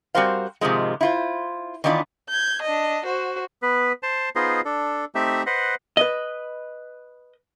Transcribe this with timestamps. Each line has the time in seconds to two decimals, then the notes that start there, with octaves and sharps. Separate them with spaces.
0.14 G3 C4 F#4 A#4 C5 F5
0.61 G#2 C3 D#3 F3 G#3
1.01 E4 F4 C5
1.84 D#3 E3 B3 D4 F4 B4
2.29 G6 G#6
2.62 D4 D#5
3.05 F#4 C5
3.62 B3 B4
4.03 C5 A5
4.36 B3 D#4 F4 G#4 C5 D#5
4.65 D4 A4
5.15 A3 C4 D#4 G4 E5
5.46 B4 C5 D#5 F#5
5.97 B4 D#5